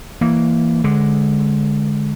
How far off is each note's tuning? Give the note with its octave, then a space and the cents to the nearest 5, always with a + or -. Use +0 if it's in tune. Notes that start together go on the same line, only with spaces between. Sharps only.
E3 +5 A#3 -5
D3 +0 G#3 +0